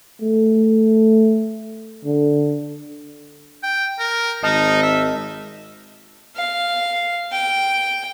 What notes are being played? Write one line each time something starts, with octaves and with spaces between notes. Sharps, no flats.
A3
D3
G5
A#4
G#1 D#4 D#5 A5 F6
E5
F5
G5